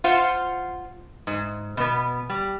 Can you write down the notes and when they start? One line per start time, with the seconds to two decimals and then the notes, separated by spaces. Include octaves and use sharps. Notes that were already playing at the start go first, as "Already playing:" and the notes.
0.04 F4 C5 F5 F#5
1.27 G#2
1.77 B2 B3
2.30 G3